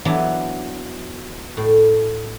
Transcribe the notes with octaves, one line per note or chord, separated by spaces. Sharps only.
E3 F#3 B3 D4
A2